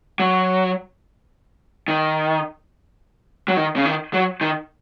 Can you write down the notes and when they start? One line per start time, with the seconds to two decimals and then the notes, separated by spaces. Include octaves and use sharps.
0.19 F#3
1.88 D#3
3.48 F#3
3.57 D#3
3.76 C#3
3.85 D#3
4.14 F#3
4.41 D#3